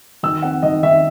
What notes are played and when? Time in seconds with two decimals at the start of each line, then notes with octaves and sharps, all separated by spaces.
0.23 D#3 E6
0.42 C4 F#5
0.63 D#3 D#5
0.83 D#3 E5